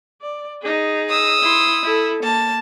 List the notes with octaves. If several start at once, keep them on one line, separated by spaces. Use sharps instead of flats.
D5
D#4 G#4
D#6 E6
E4 C6
E4 A4
A#3 A5